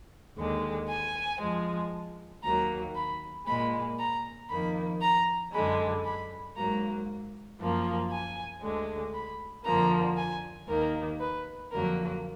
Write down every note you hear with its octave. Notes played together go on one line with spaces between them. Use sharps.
D#2 D3 G#3
G#5
F2 F3 G#3
D#2 D#3 F#3 A#3 A#5
B5
A#2 G#3 B5
A#5
F2 D#3 A#3 B5
A#5
F#2 D3 G#3 B5
B5
G#2 F#3 A#3 A#5
F#2 F3 A#3
G#5
D2 D3 G#3
B5
F2 D3 F3 A#3 A#5
G#5
D#2 D#3 A#3 A#4
B4
F2 D3 F#3 A#3 A#4